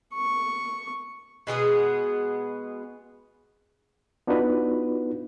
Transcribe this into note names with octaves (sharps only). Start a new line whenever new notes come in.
C#6
B2 G#3 B3 G#4
B3 D4 D#4 F4 F#4 B4